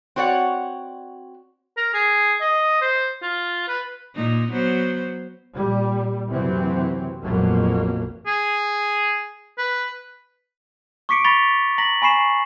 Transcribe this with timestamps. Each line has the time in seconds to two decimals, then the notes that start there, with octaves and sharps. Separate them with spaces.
0.16 C4 F#4 C#5 D5 F#5
1.77 A#4
1.94 G#4
2.41 D#5
2.81 C5
3.22 F4
3.68 B4
4.15 A#2 D#4
4.52 F#3 B3 C5
5.56 A#2 G3
6.30 F#1 C3 E3 F#3 C4
7.22 A#1 F2 G#2 B2 F#3 A#3
8.27 G#4
9.58 B4
11.09 C#6 D6 B6 C#7 D7
11.24 B5 C#6 A6 B6 F7 G7
11.78 A#5 A#6 B6 F#7
12.02 G#5 B5 C#6 C7 E7